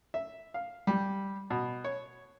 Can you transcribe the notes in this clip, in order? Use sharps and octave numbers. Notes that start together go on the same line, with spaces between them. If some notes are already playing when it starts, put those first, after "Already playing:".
E5
F5
G3
B2
C#5